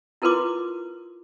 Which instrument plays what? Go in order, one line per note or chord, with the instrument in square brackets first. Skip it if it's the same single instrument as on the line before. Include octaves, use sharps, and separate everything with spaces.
[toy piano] E4 F4 A#4 B4 C6 D6